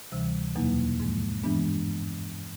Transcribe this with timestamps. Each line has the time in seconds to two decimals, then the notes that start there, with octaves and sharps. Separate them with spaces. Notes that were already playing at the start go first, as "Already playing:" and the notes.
0.12 D2 C3 E3 G3
0.55 E2 B2 F#3 A#3 D#4
1.00 G#2 F3 G#3
1.43 G2 E3 G#3 B3 D4